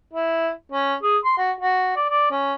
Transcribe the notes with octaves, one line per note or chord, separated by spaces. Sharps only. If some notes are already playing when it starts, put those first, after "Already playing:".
E4
C#4
G#4
C6
F#4
F#4
D5
D5
C#4